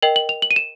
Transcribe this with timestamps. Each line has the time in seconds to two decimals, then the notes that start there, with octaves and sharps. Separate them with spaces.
0.02 A#4 D#5 G5 F#7
0.16 F#7
0.29 F7
0.42 F#7
0.51 D#7
0.56 E7